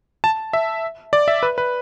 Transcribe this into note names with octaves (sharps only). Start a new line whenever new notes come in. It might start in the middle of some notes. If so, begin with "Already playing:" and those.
A5
E5
D5
E5
B4
B4